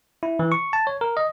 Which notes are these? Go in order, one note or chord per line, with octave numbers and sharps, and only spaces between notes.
E4
E3
C#6
A5
C#5
A#4
D#5